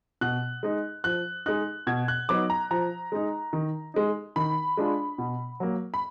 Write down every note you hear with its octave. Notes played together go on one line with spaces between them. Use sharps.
B2 F#6
G#3 D#4
F3 F#6
G#3 D#4 F#6
B2 G#6
F#6
F#3 B3 D#4 D6
A#5
F3 A#5
G#3 D#4
D#3
G#3 D#4
D#3 B5
G#3 D4 F4
B2
F#3 A#3
B5